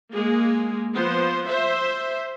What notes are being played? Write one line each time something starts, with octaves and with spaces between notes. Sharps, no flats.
G#3 A#3 G#4
F3 B3 C5
C5 E5